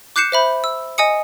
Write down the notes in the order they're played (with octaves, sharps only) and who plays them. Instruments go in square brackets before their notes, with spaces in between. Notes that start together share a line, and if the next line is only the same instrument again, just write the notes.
[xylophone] D6 F#6 G6 C7 C#7 E7
C5 E5 B5
E6
D#5 G#5 D#6 C#7